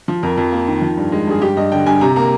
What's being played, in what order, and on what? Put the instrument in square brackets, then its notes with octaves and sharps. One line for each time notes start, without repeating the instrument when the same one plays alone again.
[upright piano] F3
F2 A#4
F2
A#3
D#3
F3
G2
G#3
G2 G#4
G2 G4
G2 D#5
D3 G5
G2 G#5
C3 A#5
A#3 A#5